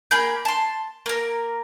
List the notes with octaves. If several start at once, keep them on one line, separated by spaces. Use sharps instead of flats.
A#3 G#4 B5 G6
A5 C6
A#3 A#4